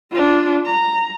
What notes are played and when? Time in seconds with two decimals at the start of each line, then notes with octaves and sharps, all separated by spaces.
0.11 D4 F4
0.66 A#5